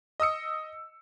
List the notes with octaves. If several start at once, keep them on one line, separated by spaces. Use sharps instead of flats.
D#5 D#6 E6 C#7